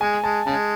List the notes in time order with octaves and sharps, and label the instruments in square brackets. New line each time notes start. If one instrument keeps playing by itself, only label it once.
[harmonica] G#3 [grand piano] G#5
[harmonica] G#3 [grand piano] A5
[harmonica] C#3 G#3 [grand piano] A5